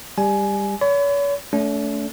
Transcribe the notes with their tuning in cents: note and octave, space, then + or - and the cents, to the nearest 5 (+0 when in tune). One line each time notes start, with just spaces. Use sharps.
G3 +20 G#5 +15
C#5 +40 B5 +35
A3 -10 C#4 +45